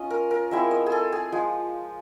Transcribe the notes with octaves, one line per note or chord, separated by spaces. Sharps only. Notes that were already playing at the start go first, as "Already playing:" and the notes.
Already playing: C#4 F4 D#5
A#4
A#4
F3 G#3 C4 E4 E5
D#5
G#4
A4
G#4
F3 G#3